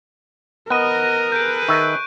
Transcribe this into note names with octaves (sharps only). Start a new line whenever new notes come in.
B3 A#4 D#5 F#6 D#7
G#4 A4 B4 G6 D7
D#3 E5 C#6